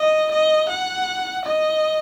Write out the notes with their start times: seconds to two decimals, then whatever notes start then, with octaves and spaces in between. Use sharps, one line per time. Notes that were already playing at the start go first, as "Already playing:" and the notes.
Already playing: D#5
0.31 D#5
0.69 F#5
1.45 D#5